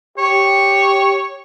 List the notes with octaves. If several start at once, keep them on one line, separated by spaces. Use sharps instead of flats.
G4 C#5